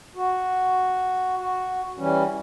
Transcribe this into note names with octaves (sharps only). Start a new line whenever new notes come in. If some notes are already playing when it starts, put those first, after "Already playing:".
F#4
F#4
E3 G3 C#4